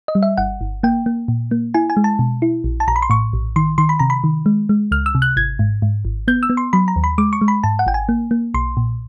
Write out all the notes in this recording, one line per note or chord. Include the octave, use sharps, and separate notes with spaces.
D#5
G3
E5
G1 F#5
G1
A#3 G5
A#3
A#2
A#3
E4 G#5
G#5
G#3
A5
B2
E4
A#1
A5
A#1 A#5
B5
C6
A2 C#6
A#1
D#3 C6
D#3 C6
B5
C3 A#5
B5
D#3
G#3
G#3
C#2 F6
E6
C3
F#6
G#1 G#6
G#2
G#2
G#1
B3 G6
E6
B3
C6
F#3 B5
A#5
D#2
B5
G#3 D6
C#6
G#3
B5
G#2 A5
F#5
G#1 G5
G#5
A#3
A#3
B1 C6
A#2